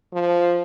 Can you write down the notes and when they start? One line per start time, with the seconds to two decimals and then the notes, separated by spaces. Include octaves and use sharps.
0.13 F3